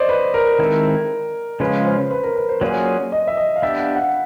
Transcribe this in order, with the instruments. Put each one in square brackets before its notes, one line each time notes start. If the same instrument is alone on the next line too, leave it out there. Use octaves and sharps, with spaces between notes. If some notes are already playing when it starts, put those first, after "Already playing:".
Already playing: [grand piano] C5 D5 D#5
B4
A#4
[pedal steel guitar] D#3 G#3 C4 E4 A4
[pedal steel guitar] C#3 F3 G#3 C#4 F4 [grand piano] B4
[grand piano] C5
B4
A#4
B4
C5
[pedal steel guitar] F#3 A#3 C#4 F4 G#4 [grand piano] D5
[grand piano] D#5
E5
D#5
F5
[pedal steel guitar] B3 D4 G4 [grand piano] E5
[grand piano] F5
F#5